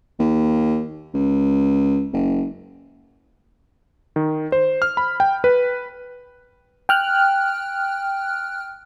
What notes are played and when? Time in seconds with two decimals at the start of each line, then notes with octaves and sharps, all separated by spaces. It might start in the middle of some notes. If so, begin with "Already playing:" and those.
0.20 D#2
1.14 C#2
2.13 F#1
4.16 D#3
4.52 C5
4.82 F6
4.97 B5
5.20 G5
5.44 B4
6.89 G5 F6 F#6